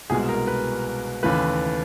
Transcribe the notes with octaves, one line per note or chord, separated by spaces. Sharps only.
C2 B2 G#3 G#4
A#4
B4
D#2 C#3 E3 A3 B4